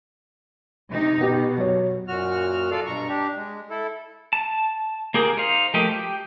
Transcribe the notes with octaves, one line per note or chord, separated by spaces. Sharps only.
C3 D#4
B2 B3 G4
F#3 C#5
F#2 A#2 F#4 F6
F4 A4 D5 F5
G2 B2 A#5 C#6
D4 G4
G#3
E4 A4
A5
A#3 G4 G#4 A#4
D#4 C5 F5
F3 A3 A#3 G4 D#5
G4